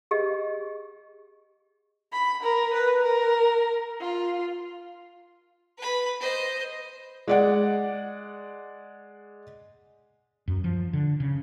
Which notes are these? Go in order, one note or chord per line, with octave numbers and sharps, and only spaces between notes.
G4 G#4 D#5
B5
A#4
B4
A#4
F4
B4 B5
C5 D#5
G#3 D5 F#5
F#2
F3
D3
C#3